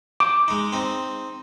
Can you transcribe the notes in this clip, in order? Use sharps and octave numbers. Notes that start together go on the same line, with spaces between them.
D6
G#3 D#4
C4 D#4